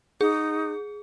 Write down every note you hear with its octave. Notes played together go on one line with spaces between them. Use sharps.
D#4 G#4